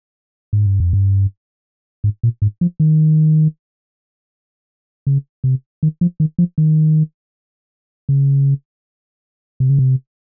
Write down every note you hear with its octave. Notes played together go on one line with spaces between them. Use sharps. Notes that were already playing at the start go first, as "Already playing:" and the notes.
G#2
G2
F2
G2
G#2
A#2
G#2
F3
D#3
C#3
C3
D#3
F3
D#3
F3
D#3
C#3
C3
C#3
C3